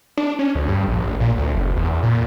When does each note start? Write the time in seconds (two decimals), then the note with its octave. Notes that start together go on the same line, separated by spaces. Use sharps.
0.17 D4
0.39 C#4
0.55 D2
0.68 G2
0.88 A#1
1.07 A1
1.20 A#2
1.37 D2
1.54 F#1
1.77 E2
1.89 E2
2.03 A#2